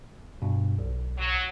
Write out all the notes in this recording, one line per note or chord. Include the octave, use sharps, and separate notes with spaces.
G2 B2
B1
F#3